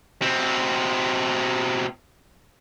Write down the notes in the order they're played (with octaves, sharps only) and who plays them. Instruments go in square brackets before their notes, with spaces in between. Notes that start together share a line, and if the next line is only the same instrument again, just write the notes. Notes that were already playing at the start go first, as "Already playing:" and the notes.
[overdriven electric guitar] B2 C4